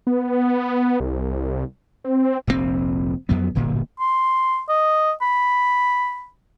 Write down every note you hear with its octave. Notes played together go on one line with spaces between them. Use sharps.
B3
C2
C4
F1 A#1 A#2 C4
F2 F#3 B3
D1 G1 A#2
C6
D#5
B5